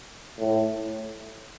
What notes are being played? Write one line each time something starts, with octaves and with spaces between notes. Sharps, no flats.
A2